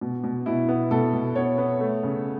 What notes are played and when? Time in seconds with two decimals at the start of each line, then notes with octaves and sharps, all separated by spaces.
0.01 B2
0.24 B2
0.46 B2 E4
0.68 B3
0.91 B2 A4
1.13 B2
1.35 B3 C#5
1.58 B3
1.80 A3
2.03 C#3